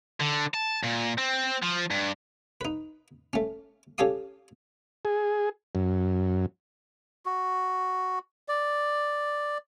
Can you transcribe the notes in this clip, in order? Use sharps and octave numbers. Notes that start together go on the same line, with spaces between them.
D3
A5
A#2
C4
F3
G2
D#4 B4
A3 C#4
C#4 G4 A4 C#5 F5 D#6
G#4
F#2
F#4
D5